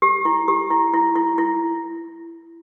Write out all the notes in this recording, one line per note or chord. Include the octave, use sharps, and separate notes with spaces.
G4
E4
G4
E4
E4
E4
E4